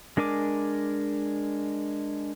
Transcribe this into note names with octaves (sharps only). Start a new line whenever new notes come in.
G#3 D4 A#4 G#5 D6